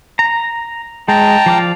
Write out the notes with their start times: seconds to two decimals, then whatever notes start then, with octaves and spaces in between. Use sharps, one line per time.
0.19 A#5
1.08 G#3 G5 A5 A#5
1.46 F3 D5 F5